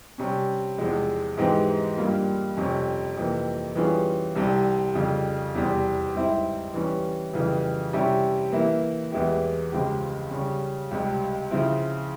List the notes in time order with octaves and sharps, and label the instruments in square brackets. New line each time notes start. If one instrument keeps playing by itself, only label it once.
[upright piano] C3 G3 C#4
E2 C3 F3 G#3
G#2 E3 G#3 C4 G4
G2 G3 A#3 F4
F2 C3 G3 C#4
F2 C3 E3 A#3
E3 G3 C#4 F4 G#4
C2 C3 G3
F2 C#3 G3
E2 C3 G3 C4
G#2 G3 C4 E4
E3 G3 C#4
F2 C#3 E3 G3
C3 G3 C#4 E4 G4
E3 A#3 E4
E2 E3 G#3 E4 G4
C#2 C#3 F3 C4 G4
C#3 G3 C#4
C#2 C3 G3
C#3 F3 C4 E4